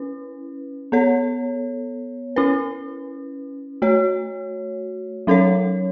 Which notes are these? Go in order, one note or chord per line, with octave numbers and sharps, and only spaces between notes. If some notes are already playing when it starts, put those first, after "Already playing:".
Already playing: C#4 E4 B4
B3 A4 C#5
C#4 E4 B4
A3 F#4 C#5
F#3 C#4 A4 C#5